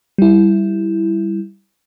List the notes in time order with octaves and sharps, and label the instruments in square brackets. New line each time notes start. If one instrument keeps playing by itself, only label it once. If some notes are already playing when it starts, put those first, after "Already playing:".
[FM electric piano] G3 E4